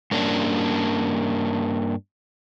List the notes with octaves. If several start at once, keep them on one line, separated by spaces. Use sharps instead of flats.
G2 A#3 C#4 D4